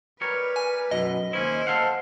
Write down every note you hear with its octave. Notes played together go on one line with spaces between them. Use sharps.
G3 A#4 B4 C#5
G#5
B1 F#2 B2 D#5
D#2 C#4 E4 C5
A4 F5 F#5